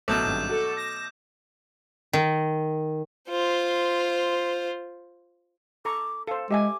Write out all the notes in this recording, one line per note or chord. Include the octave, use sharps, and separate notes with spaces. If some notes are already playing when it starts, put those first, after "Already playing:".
A1 B2 F#3 A3 D6 G6 E7
G#1 G2
F#4 A4
A#6
D#3
F4 C5
A4 A#5 C#6 D6
A4 C5 F5
G#3 G4 E5 G#5 D6